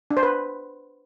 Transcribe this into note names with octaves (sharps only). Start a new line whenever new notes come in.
D4
C5
B4